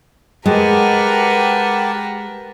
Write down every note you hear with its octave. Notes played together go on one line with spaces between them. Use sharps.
G#3 G4 A#4 B4 F#5 A5